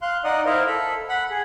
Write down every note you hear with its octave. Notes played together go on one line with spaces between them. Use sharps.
F5 C6 F#6
D#4 D5 D#5 F#5 D#6
E4 A#4 C5 D#5 F5
A4 B5
F#5 B5
G#4